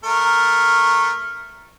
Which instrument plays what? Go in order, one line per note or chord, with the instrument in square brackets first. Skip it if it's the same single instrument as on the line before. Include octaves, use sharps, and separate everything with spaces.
[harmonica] A3 A#4